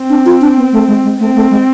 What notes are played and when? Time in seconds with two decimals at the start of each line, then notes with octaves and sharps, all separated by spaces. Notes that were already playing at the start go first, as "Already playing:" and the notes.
Already playing: C4
0.10 D4
0.26 F4
0.41 D4
0.57 B3
0.73 A3
0.88 G#3
1.04 G#3
1.19 A3 C4
1.35 A3
1.50 G#3